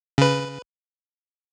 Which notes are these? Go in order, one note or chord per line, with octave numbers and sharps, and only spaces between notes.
C#3 B4